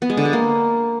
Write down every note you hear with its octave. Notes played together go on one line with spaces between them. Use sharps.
B3
G#3
D3
G#3
A#3